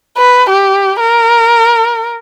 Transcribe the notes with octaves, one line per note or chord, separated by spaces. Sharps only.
B4
G4
A#4